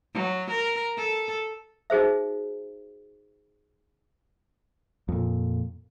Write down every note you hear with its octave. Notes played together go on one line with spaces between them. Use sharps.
F#3
A#4
A4
D#4 F#4 G#4 C5 E5
F2 A#2